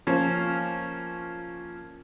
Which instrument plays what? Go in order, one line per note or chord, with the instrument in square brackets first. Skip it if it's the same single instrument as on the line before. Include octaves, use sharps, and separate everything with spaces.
[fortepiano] F3 A#3 C#4